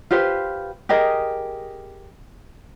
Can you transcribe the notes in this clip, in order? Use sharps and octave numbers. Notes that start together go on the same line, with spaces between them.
F4 G4 B4 C5
G4 G#4 A#4 D#5